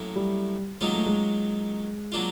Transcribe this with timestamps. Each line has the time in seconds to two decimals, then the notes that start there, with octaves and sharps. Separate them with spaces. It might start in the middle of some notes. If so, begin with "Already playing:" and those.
Already playing: A2 F#3 A#3 C#4 E4
0.16 G3
0.81 D#3 F#3 G#3 A#3 C#4 F4
0.94 A3
1.06 G#3
2.12 F#3 A#3 D4 F4